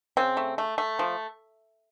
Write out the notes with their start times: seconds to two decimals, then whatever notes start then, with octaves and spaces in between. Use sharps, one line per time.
0.17 C#3 C4
0.37 A3
0.58 A3
0.78 A3
0.99 F3